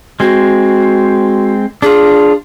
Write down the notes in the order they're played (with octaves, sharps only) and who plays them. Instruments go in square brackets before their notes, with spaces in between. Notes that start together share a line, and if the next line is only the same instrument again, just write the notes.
[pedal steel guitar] G#3 C4 [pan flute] F#4
[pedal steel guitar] D4 F4 [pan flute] G#4